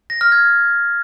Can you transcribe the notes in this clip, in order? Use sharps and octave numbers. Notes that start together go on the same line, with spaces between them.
A#6
F6
G#6